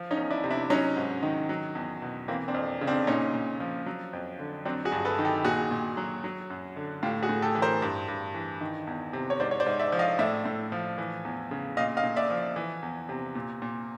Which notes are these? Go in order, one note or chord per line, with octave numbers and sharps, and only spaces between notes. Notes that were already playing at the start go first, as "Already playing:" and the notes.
Already playing: F3
C#4 D#4
E2
D4 E4
C3
D4 E4
F#3 C#4 D#4
G#2
D#3
F#3
E2
B2
E3 A#3 C4
C4 D4
F2
C#3
C4 D4
A#2 C#4 D#4
A#2
F3
F#3
F2
D3
F#3 C4 D4
F#4 G#4
G2
A4 B4
D#3
G4 A4
A#2 F#4 G#4
A#2
F#3
F#3
F#2
D3
A2 F4 G4
F#4 G#4
A2
G4 A4
E3
A#4 C5
G2
G2
E3
D#3
E2
C3
C#5
G#2 C5 D5
C#5
C5 D5
G#2
D5 E5
F3
D#5 F5
A2 D5 E5
A2
F3
E3
E2
C#3
A#2 D#5 F5
D#5 F5
A#2
D5 E5
F3
E3
E2
C3
A#2
A#2